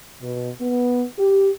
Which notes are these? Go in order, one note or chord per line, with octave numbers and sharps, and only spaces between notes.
B2
B3
G4